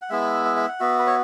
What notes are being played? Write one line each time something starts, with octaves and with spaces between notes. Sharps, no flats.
F#5
G#3 B3 E4 E5
E5
E5
F#5
B3 F#4 E5
B4
C#5